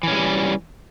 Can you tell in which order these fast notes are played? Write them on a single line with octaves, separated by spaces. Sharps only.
E3 C#4 G#3 G3